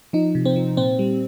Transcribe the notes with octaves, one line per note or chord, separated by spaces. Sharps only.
F3 D#4
C3
C4
F3
A#2 C4
G3